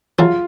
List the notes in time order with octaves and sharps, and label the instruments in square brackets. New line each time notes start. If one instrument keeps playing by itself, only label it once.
[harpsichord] C#3 F#3 A3 C#4 [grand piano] F4